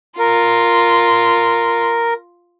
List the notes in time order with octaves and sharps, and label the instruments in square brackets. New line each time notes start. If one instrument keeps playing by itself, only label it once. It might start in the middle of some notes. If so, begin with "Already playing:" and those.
[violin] F4 [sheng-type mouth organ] A#4